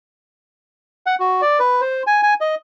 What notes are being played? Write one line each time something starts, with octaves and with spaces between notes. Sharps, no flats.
F#5
F#4
D5
B4
C5
G#5
G#5
D#5